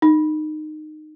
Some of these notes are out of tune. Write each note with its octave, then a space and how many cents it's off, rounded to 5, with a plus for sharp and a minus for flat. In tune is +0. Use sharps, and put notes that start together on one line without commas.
D#4 -20